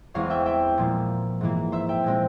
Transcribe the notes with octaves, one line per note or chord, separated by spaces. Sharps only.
E2 E3 G#3 C4 C#5 F5
E5 G5
E5 G5
A#2 F3 A#3
G#2 E3 A#3
C5 E5
E5 G5
A#2 G#3 C4